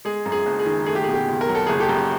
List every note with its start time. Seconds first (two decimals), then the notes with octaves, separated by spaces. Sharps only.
0.05 G#3 G#4
0.26 F#2
0.32 G#4
0.46 F#1
0.59 G#4
0.66 D#3
0.86 A3 G#4
0.95 G4
1.04 G#4
1.08 B2
1.14 G4
1.28 C#2
1.41 A#4
1.49 F#3
1.55 A4
1.67 F#1 G#4
1.80 G4 A4
1.89 F#2